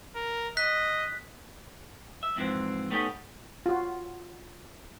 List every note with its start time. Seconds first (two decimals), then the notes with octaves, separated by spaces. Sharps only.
0.15 A#4
0.57 D#5 F#6 B6
2.23 E5
2.36 F2 G#2 E3 F3 C4
2.91 A3 B3 C#4 D#4 F4 G4
3.66 F4 F#4